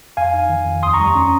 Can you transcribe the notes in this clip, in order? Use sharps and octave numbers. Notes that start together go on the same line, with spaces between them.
F2 F5 G#5
D#4
D#3
F2
D#2 C6 D#6
A#5 C#6
G3
C#4